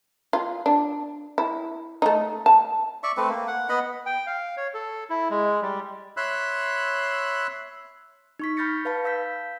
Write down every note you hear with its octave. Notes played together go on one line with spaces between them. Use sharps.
F4
D4
E4
A3 D#4
A5
D5 E5 C#6
A3 C4 B4
A#3
F#5
B3 D#5 F#5 B5
G5
F5
C#5
A4
E4
G#3
G3
C#5 E5 B5 C6 E6 F#6
D#4 C#6 B6
B5 F6 G6 A6 A#6 C#7
B4 F5 A5 B5
F5 E6 G6 B6